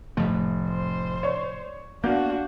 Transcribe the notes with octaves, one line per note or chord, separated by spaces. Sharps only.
F1 A2 F3 A3
C5
C#5 D5 C#6
A#3 B3 D4 F#4 F5 G6